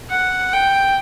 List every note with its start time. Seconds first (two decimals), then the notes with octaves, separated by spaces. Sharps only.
0.09 F#5
0.53 G5